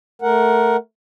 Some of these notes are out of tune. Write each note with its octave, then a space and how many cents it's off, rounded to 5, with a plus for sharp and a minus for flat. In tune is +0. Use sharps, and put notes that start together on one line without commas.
A3 +0 A#4 +10 F#5 +0